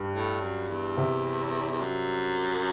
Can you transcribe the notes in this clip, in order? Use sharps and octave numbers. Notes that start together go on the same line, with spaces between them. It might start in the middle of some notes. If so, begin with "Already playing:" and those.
Already playing: G2
A2
F#2
E2
C3
E2
F#2